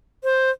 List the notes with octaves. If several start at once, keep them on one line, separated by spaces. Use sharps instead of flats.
C5